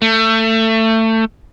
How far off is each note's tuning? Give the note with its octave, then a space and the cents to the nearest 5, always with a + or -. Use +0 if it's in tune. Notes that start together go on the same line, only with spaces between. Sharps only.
A3 +25